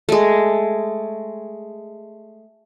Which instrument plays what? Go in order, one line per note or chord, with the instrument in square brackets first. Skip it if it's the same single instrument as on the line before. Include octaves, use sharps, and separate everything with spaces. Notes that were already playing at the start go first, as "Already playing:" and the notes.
[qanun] G#3 A3